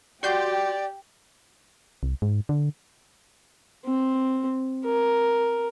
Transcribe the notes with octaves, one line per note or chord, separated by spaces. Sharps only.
F#4 G4 D5 G5 C6 G6
C2
G#2
D3
C4
A#4